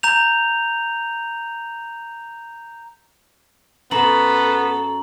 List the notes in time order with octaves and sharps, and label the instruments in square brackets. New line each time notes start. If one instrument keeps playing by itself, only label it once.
[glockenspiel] A#5 G6 F7
[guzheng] F#2 F#4 C5 [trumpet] B3 [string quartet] A4 [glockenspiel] A#5 F#7